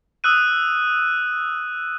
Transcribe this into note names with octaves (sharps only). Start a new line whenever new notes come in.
D#6 E6 F#6 D#7